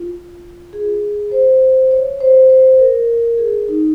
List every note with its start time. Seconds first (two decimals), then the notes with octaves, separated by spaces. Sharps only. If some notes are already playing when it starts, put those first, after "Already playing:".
Already playing: F4
0.73 G#4
1.31 C5
1.91 C#5
2.20 C5
2.49 C5
2.79 A#4
3.38 G#4
3.68 D#4